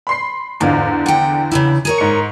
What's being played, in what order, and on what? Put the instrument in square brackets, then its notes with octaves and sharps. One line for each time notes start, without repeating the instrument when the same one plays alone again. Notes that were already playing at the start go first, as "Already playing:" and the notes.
[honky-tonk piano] B5 C6 C7
[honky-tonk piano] E2 D3 F5 [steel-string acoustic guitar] G#2 F4
[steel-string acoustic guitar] F#5 G5
C#3 E3 E4
G#4 A#4 C#5
[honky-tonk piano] G#2 C#7